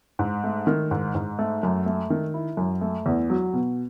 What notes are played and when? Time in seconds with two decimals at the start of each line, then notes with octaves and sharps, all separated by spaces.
0.19 G#2
0.44 A3
0.67 D#3
0.91 G#2
1.15 G#2
1.39 A3
1.63 F#2
1.86 A3
2.10 D#3
2.34 E4
2.57 F#2
2.81 A3
3.06 E2
3.30 F#3
3.53 B2